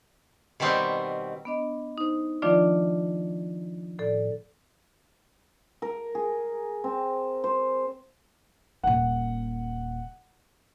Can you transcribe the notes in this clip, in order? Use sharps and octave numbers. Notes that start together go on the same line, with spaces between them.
B2 D#3 G3 B3 C4
B3 D4 D#5
D#4 C5
D#3 F3 A3 D4 F4 D5
A2 A4 D5
A#4
G#4
C4
C5
D#1 A#2 F#5